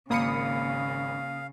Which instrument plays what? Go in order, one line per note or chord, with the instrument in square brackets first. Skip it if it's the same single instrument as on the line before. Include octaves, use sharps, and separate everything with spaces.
[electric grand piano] G#1 B5 C#7 [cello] C#3 [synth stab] A#3 D#6 [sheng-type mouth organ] F5